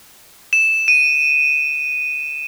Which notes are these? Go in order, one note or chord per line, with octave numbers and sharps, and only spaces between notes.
E7
D#7